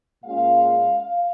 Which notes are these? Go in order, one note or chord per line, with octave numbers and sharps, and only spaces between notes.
A#2 G#3 C#4 F4 F5
F5